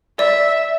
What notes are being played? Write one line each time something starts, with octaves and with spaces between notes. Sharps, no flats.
D5 E5